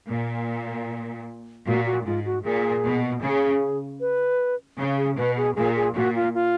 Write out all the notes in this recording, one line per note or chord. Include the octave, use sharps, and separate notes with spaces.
A#2
A#2 F#4
F#4
G#2 F4
F#4
A#2 G#4
B2
C#3 G#4
B4
C#3
G#4
B2 B4
G#4
A#2 G#4
G#4
A#2 F#4
F4
F4